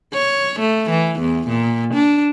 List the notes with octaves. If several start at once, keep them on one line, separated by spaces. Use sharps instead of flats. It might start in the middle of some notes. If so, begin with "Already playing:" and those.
C#5
A3
E3
E2
A#2
D4